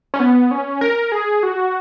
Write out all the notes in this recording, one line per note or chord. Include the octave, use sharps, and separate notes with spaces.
C#4
B3
C#4
A#4
G#4
F#4